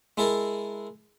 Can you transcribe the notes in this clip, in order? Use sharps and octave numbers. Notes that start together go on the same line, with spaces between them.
G#3 E4 A4 A#4